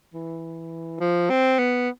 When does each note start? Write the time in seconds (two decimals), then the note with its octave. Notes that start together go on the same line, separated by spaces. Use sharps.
0.14 E3
1.00 F3
1.30 C4
1.59 B3